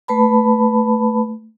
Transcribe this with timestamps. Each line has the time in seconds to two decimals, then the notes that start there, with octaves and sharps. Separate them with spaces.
0.08 A3 B4 A5 B5